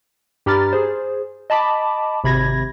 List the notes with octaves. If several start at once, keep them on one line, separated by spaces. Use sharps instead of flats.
G2 G4 A#5 B5 F6 A6
G#4 C5
D#5 A5 B5 D6
G#1 C3 B5 G#6 A#6